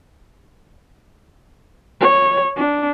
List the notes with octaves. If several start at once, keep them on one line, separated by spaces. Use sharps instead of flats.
C#5
D4